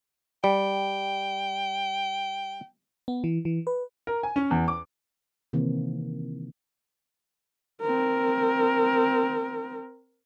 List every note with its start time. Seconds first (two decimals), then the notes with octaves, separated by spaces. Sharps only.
0.44 G3 G5
3.08 B3
3.24 E3
3.45 E3
3.67 B4
4.07 A#4
4.23 G#5
4.36 C#4
4.51 E2
4.68 D6
5.53 C3 D#3 E3 A#3 C4
7.82 C4 A#4